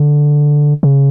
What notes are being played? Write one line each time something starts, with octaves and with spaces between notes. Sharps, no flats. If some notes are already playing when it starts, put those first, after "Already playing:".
Already playing: D3
C#3